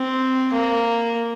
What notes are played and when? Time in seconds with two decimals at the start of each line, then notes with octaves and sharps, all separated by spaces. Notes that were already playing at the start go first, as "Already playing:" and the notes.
Already playing: C4
0.53 A#3